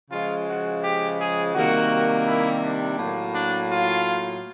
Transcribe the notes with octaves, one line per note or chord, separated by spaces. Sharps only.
C#3 F3 G#3 F4
F#4
G4
G#4
C3 D#3 G3 A#3 F#4
E4
D4
A2 F#3 A#3
D4
F4